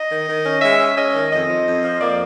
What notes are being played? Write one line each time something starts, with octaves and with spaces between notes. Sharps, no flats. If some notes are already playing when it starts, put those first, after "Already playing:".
Already playing: D#5
D#3
D#3
C#4
G#3 E5
C#4
C#4 D#5
D#3
F2 D#5
F3
F2
F3
A#3 D5